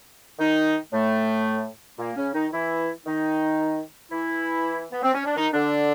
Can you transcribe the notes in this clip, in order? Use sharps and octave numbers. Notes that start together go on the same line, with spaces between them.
D#3 D#4
A2 A3
A#2 A#3
C#3 C#4
D#3 D#4
E3 E4
D#3 D#4
E3 E4
B3
C4
C#4
D4
D#3 D#4
D3 D4